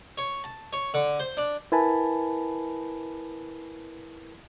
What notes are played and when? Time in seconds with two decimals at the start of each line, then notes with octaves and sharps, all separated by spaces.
0.18 C#5
0.44 A5
0.73 C#5
0.94 D3
1.19 C5
1.37 D4
1.72 E4 A#4 B4 G#5 A5 B5